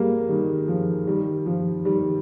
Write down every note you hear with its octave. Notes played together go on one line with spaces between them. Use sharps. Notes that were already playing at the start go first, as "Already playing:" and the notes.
Already playing: G3 G#3 A#3
D#3 G3
F3
D#3 G3
F3
D#3 G3